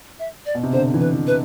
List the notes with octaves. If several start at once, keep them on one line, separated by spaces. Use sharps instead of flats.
E5
D5
B2
C3
D3 C5
E3
B4
E3
B4